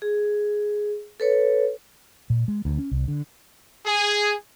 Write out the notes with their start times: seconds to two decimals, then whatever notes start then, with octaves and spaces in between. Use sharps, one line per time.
0.02 G#4
1.20 A4 B4 C#5
2.30 A#2
2.48 G#3
2.65 D2
2.78 C#4
2.91 C2
3.08 D3
3.86 G#4